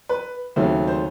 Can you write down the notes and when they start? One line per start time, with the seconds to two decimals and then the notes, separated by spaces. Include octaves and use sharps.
0.09 B4
0.56 D#2 C#3 F#3 A3 C4
0.88 C5